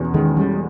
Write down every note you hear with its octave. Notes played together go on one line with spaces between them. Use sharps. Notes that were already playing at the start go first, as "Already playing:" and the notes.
Already playing: E2 B2 C#4
D#3 G#3
G3 C#4